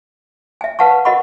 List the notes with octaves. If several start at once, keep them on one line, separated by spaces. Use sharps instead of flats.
E5 G#5
B4 F5 F#5 A5 C#6
B4
F#4 A#4 D#5 F#5 B5 C#6